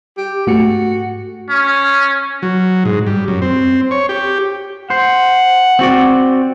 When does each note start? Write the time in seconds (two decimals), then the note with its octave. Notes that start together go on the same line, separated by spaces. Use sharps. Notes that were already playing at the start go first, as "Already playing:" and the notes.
0.18 G4
0.47 G#2 A3 F#4 C#7
1.50 C#4
2.42 F#3
2.85 G#2
3.07 G3
3.28 F#2
3.42 C4
3.91 C#5
4.09 G4
4.90 C5 F#5
5.79 C4 F#4 D5